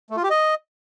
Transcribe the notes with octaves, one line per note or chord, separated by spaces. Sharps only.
A3
F4
G4
D#5